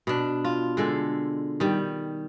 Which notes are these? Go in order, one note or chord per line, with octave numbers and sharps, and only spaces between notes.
B2 D4
F4
D3 G#3 A4
D#3 G3